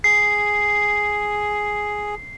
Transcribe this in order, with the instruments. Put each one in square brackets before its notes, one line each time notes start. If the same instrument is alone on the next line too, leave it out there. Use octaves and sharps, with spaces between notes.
[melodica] G#4 [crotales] C7